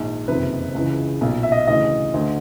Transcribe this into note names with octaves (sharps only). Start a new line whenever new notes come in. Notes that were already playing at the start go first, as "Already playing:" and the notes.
Already playing: A#1 G#2 D#3
F#1 F2 C3 D#3 B4
C#2 C#3 E3
B1 A#2
E5
D#5
D2 C#3 E3 D#5
D2 D3